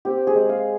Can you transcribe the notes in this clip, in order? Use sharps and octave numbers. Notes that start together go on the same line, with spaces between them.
C4 G4
G#4
G#3
F5